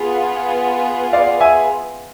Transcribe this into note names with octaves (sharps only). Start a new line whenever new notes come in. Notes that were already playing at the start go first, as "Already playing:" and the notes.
Already playing: B3 F4 G#4
D5 F5
E5 G#5